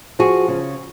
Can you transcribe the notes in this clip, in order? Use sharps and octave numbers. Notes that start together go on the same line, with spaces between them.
F3 F#4 G#4
C#3